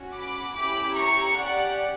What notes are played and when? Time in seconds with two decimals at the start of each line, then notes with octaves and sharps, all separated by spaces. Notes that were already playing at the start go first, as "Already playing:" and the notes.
Already playing: C#4 F#4
0.14 B5 D6
0.55 C#4 E4 G4 B5 D6
0.95 A#5 C#6
1.35 C#4 G4 D5 F#5